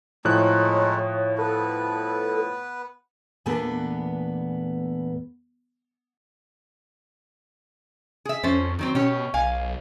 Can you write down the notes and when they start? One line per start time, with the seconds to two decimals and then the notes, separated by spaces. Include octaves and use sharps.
0.25 A2 F3 G#3 A3 D#4 C#5 F#6
1.38 B3 A4 B4
3.46 E2 A#2 A3 B3 D4 B4
8.25 G#4 E5
8.43 F2 C#4 A4 C5
8.79 D#3 F#3 C4
8.95 B2 C#4 G4 C#5
9.34 B1 F5 G#5